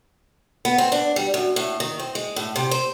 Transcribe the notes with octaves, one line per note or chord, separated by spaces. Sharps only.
B3
C4
D4
G3
F#2
A2
D#3
C4
G#3
A2
C3
C5